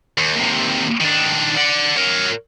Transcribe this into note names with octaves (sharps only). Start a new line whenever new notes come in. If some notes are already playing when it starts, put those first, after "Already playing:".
D#2
D#2 C3
D#3 D4
D5 F#5
A#4 C#5